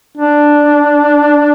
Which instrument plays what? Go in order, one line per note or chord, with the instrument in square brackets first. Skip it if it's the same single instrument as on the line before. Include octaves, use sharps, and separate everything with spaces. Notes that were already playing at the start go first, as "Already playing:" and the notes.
[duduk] D4